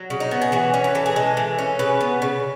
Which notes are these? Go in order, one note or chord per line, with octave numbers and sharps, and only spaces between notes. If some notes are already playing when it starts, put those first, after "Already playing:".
Already playing: F#3
C#3
D#4
B3
G#4
E3 F#4
C#4
B4
E3 A4
G#4
G#3 A4
E3
C#4
C#3 B4
B3
C#3